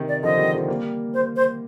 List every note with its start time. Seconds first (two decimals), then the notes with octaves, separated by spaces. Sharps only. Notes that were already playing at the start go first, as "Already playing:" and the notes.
Already playing: C3 D#3
0.08 D5
0.23 D3 F3 D#5
0.38 D#3 G3
0.54 D3 F3
0.68 G3 A#3
1.14 C5
1.36 C5